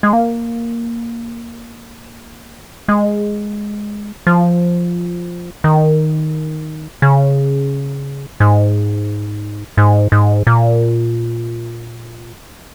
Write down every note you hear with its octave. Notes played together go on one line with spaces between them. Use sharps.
G#3
A#3
G#3
F3
D#3
C#3
G#2
G#2
G#2
A#2